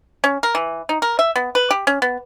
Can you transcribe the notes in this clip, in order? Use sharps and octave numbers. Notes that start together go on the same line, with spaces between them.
C#4
A#4
E3
D#4
A#4
E5
B3
B4
G4
C#4
B3